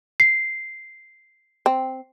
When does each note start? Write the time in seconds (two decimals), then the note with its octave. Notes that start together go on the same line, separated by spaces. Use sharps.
0.20 C7
1.66 C4